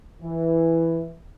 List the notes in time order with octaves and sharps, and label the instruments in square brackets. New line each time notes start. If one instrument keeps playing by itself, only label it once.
[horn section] E3